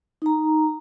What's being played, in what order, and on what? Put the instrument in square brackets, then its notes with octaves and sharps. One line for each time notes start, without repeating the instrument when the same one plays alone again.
[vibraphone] D#4 A#5